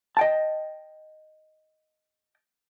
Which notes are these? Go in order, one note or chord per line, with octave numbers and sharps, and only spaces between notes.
D#5 G5 A5